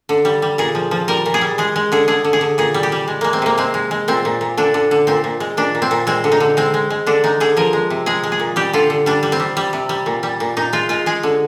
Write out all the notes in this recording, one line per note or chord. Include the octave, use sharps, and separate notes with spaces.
D3
G3
G3
A#2 G#4
F3
F3
G3 A#4
A#2
G#4
G3
G#3 G#4
G#3
D3 G#4
D3 G#4
D3
G#4
D3
A#2 G#4
G3
G4
G3
G#3
G#3 A#3
C4
C3 A#3
G#3 C4
G#3
G#3
A#2 C4
A#2
A#2
D3 D4
D3
D3
A#2 C4
A#2
G#3
A#2 D4
A#2
C4
A#2
G#3 C4
D3
D#4
D3
G#3 C4
G#3
G#3
D3 D4
G#3 D#4
D3 G#4
F3 A#4
G#3
C3
G#3 G#4
G#3
G#4
A#2
G3 G4
D3 F4
D3
G3 D4
G3
C4
G3
G3
C3
G3
A#2
G3
A#2
A#2 D#4
G#3 F4
G#3 F4
G#3 G#4
D3